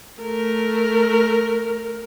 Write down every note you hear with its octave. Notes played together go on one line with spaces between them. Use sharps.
A3 A#4